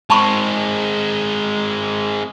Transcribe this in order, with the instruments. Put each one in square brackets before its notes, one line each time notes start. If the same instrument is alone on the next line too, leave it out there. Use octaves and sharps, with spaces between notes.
[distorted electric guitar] G#3 C4 [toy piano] A5 B5 C#6